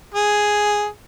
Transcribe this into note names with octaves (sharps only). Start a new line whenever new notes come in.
G#4